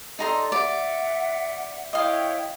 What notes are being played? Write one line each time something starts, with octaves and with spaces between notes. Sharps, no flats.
D#4 A4 D5 A#5 C6
D5 E5 F#5
E4 C#5 D#5 F5 G5